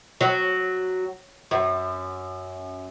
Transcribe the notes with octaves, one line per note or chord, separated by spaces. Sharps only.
F#3
F#2